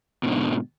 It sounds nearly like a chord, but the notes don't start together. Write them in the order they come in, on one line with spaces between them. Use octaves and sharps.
B2 G#2 D3